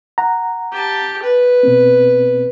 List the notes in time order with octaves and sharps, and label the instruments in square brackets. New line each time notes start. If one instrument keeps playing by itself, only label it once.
[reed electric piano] F#5 A#5
[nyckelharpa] G4 A5
B4
[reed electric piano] B2 B3 C4